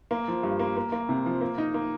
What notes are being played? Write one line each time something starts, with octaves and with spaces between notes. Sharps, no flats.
A#3
F3
G2
A#3
A#3
A#3
C3
F3
A#3
D#4
A#3